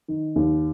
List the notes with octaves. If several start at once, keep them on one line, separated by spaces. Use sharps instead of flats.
D#3
D#2